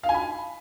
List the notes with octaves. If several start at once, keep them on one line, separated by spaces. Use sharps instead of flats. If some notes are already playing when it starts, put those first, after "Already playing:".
F5
G#5
B5